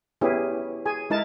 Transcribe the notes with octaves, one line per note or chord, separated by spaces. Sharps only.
B3 C#4 E4 G4 G#4
G#4 G#5
G#3 D#4 E4 A#4 A5